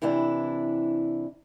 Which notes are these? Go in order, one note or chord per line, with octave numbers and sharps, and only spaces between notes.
C3 E3 D4 E4